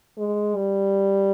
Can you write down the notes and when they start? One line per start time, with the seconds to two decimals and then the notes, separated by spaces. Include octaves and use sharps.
0.18 G#3
0.56 G3